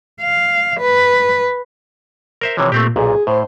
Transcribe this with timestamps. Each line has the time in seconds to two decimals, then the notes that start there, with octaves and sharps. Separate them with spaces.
0.22 F5
0.80 B4
2.41 A#4 C5 E5
2.57 C3 E3 F3 C#5
2.72 A#2 A3 C4 G4
2.96 B1 A#2 G#4
3.27 A2 C5